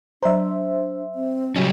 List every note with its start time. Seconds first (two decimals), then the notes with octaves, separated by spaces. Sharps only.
0.23 F#3 D4 C5 D5 E5 A#5
1.15 C4
1.56 C#3 F#3 G3 C#4 F#4